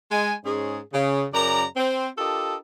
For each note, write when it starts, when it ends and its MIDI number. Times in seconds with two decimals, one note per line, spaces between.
0.11 0.33 56
0.11 0.33 80
0.44 0.79 44
0.44 0.79 61
0.44 0.79 68
0.93 1.25 49
1.34 1.64 42
1.34 1.64 49
1.34 1.64 70
1.34 1.64 74
1.34 1.64 82
1.76 2.08 60
2.18 2.55 62
2.18 2.55 65
2.18 2.55 67
2.18 2.55 69
2.18 2.55 70
2.18 2.55 75